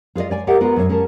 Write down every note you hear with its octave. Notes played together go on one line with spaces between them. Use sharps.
F4 G#4 B4 D5 D#5
C#5 D5 G#5
G4 G#4 A#4 D5 E5 F#5
B3 F4 F#4 A#4
F#2 B2 G#4 C#5
C#4 G#4 A#4 A5